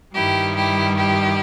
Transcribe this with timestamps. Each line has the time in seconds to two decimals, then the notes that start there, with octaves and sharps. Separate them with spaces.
0.13 G2 D#3 G3 E4 G4
0.55 E4 G4
0.97 E4 G4